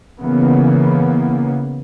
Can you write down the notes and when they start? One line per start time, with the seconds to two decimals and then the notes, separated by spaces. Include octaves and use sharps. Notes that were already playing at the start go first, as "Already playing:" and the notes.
0.20 C#3 E3 A#3 B3